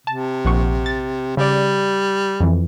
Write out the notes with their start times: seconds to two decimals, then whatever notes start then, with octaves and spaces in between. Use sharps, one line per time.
0.07 C3 A5
0.45 A#1 F#5 C#6
0.86 A6
1.37 C#3 G3 D5
2.40 F2 E3